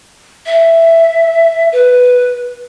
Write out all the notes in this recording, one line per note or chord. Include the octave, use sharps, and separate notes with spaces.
E5
B4